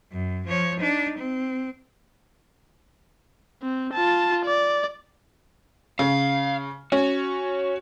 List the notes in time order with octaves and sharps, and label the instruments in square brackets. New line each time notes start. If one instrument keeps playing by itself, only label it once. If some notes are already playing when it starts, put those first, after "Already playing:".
[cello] F#2
F3 C#5
D4 D#4
C4
[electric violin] C4
F4 A5
D5
[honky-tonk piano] C#3 [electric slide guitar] F5
[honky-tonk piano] C#4 [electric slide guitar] F#4